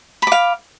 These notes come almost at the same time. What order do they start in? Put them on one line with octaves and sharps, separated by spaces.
B5 D6 F5